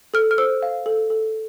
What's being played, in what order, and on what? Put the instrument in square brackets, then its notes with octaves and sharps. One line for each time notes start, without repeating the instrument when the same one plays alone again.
[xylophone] A4 F6
F6
C5 E6
F5
A4
A4